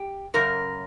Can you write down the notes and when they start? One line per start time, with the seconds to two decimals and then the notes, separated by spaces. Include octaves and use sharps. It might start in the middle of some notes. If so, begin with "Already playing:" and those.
Already playing: G4
0.34 F#2 C#3 A#4